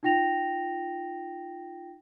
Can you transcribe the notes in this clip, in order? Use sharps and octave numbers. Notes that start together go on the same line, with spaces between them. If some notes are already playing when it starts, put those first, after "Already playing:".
D#4 F4 G5 A#6 F7